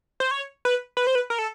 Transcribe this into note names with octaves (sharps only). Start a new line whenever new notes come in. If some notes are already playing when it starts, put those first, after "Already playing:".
C5
C#5
B4
B4
C5
B4
A#4
A4